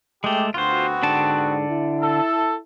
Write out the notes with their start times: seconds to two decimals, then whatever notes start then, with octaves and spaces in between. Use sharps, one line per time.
0.24 G#3 A3 G4
0.54 D2 B3 C4 F4 F#4 C5
1.03 G#2 D3 D4 A5
1.69 E4
2.01 A4